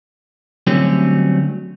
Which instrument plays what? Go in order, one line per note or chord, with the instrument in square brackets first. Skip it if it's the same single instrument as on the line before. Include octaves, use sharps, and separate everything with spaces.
[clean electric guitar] D3 F#3 G3 A3 C4 C#4